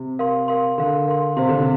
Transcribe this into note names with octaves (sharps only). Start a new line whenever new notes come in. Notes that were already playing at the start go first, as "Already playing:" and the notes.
Already playing: C3
A#4 F5 C6
A#4 F5 C6
D3 A#4 F5 C6
A#4 F5 C6
C3 C5 F5 C6
D3
C3